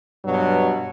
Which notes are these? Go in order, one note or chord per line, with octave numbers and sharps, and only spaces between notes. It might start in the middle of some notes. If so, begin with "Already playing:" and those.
G2 B2 F#3